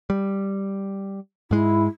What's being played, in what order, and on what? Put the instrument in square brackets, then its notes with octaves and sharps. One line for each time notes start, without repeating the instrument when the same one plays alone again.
[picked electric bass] G3
[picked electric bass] G#2 G#3 [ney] E4